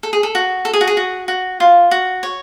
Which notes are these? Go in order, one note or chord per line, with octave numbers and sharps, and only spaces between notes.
A4
G#4
A4
F#4
A4
G#4
F#4
G#4
F#4
F#4
F4
F#4
C#5